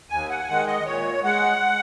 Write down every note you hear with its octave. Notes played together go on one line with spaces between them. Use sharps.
D#2 G#5
F#5
G#5
D#3 G#3 F#5
D#5
A#2 C#5
G#3 F#5